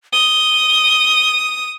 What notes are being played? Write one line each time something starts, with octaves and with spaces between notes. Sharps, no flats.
D#6 G7